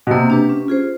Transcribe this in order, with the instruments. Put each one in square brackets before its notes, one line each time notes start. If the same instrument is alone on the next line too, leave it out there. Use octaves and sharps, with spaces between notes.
[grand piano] B2
[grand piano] C3 [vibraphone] A#3
[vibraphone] D4 G4 B4
C#4
F4 G#4 C5